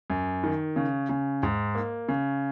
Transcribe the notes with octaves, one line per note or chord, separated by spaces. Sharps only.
F#2
D#3
C#3
C#3
G#2
A#3
C#3